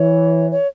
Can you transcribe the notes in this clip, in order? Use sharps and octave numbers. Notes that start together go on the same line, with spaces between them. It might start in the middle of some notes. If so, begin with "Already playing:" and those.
Already playing: E3 C#5
C#5